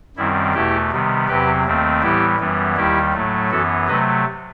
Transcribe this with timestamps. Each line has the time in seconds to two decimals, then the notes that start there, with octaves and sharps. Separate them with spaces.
0.17 F#2 D#3 G3 C4 E4
0.54 E2 B2 A3 E4 G4
0.91 C3 D#3 G3 B3
1.28 E2 C3 F#3 C4 G4 B4
1.65 D#2 D#3 A3 C4
2.02 A2 E3 G3 B3 E4 G4
2.39 F#2 E3 G3 B3
2.76 D#2 D#3 G3 E4 G4
3.14 A2 F#3 A3
3.51 F#2 E3 B3 F#4 A4
3.88 C3 F#3 A3 B4 D#5